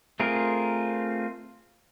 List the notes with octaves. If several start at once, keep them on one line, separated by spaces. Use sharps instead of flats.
A3 C4 F4 G#4 A#4